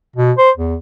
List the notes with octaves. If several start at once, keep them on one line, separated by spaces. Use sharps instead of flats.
B2
C5
E2